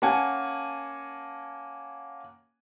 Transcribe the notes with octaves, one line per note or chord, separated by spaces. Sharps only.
A#3 C#4 F#5 G#5 A5